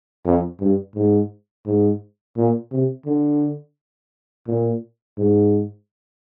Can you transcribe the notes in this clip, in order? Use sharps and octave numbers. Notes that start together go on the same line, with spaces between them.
F2
G2
G#2
G#2
A#2
C3
D3
A#2
G#2